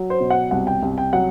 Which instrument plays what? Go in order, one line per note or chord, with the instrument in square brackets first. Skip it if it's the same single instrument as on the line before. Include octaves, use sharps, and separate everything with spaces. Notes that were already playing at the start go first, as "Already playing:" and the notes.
Already playing: [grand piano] F#3
C5
B2
F#5
C2 F#5
G5
C2
G5
F#3 F#5